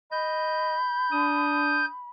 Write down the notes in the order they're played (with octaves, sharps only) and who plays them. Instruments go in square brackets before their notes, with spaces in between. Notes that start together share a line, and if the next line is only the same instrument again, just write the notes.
[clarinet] D#5 [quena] B5 [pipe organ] G6
[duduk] D4 [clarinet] D#6